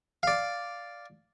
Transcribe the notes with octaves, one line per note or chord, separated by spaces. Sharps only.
D5 F5